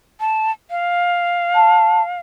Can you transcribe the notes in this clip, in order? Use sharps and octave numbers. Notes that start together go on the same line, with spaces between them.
A5
F5
A5